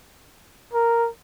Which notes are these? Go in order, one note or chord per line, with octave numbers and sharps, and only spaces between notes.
A#4